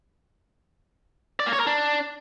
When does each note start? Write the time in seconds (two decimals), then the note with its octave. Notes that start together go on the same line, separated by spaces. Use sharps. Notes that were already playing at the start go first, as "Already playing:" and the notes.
1.40 D5
1.46 A#3
1.53 C#5
1.60 A#4
1.67 D4